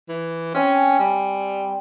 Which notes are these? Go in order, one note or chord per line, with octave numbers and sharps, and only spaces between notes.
E3
C4 C#4 G#5
G3